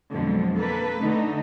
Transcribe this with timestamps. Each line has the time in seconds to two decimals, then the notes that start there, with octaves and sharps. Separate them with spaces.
0.11 F2 B2 D3 F3 F#3 G#3
0.58 A#3 A4 B4
1.01 D3 A3 D#4